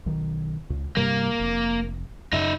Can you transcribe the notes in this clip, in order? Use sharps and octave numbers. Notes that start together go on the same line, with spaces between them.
B1 D#3
C#2
G2 C3 G3 A#3
F1
F#2 C#3 D#4 E5